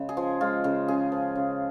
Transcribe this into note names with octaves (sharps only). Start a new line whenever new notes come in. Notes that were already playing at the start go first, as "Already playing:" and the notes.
Already playing: C#3 G#3
G#4
F3
G#3 F4
C#3
C#3 G#4
F3
C#3